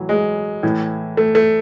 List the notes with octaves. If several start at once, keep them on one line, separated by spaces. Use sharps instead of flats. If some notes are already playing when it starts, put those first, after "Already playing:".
Already playing: A2 E3 F#3
G#3
A2 E3
A3
A3